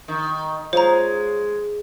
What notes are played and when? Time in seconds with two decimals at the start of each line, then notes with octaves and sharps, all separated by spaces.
0.08 D#3
0.73 G#3 F4 C5 C#5 A#5